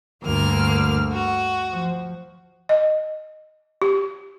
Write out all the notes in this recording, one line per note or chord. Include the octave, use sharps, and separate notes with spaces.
D2 G2 D3 A#3 F6
F#4
F3
D#5
G4